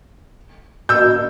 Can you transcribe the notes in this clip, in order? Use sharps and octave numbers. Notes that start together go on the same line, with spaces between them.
E6 G6